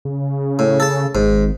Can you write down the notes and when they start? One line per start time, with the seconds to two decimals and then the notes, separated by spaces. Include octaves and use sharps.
0.05 C#3
0.59 A2
0.80 A4 A5
1.15 G#1 G#2